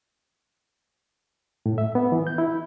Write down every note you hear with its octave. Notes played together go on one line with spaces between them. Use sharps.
A2
E5
B3
E3
G6
E4